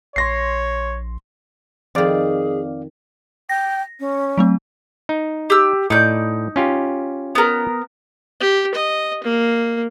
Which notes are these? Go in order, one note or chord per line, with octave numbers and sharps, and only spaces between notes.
A#1 C#5 C6 A#6 C7
F2 D#3 C4 G#4 D5 F5
G5 A#6
C#4
F#3 A3 C4
D#4
G4 E6
A2 D#4 D5 G6
C#4 F4 G4
B3 A#4
G4
D#5
A#3